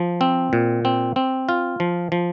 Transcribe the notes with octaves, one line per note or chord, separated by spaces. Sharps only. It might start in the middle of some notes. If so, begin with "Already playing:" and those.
Already playing: F3
C4
A#2
C4
C4
F4
F3
F3